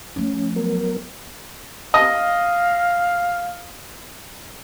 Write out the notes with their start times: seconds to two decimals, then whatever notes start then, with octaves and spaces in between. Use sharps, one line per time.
0.16 F3 A3 C#4
0.56 F#3 B3 A#4
1.94 D#5 F5